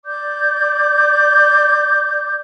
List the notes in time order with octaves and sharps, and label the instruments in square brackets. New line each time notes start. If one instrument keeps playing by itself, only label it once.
[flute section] D5 D6 G6